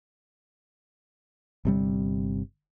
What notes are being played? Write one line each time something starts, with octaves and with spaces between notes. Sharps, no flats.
G1 C3 G3